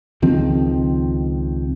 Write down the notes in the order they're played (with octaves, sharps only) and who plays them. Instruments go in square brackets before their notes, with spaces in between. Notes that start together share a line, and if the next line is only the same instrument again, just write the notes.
[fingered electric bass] C#2 D#3 F3 C4